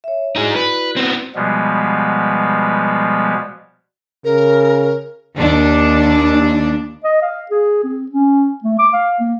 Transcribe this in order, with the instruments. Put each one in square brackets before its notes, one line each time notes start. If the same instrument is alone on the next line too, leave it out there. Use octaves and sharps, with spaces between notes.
[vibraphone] C#5 E5
[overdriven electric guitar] D#4 G#4 [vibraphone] E4 F#4 D5
[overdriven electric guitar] B4
B3 C4
[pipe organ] B2 F3 G3 G#3 B3
[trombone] C#3 [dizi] A#4
[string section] D#2 D4
[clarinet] D#5
F5
G#4
C4
C#4
A3
D6
F5
A#3